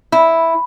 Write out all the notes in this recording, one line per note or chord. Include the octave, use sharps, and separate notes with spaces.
E4